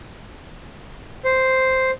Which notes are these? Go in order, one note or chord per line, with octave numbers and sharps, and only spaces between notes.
C5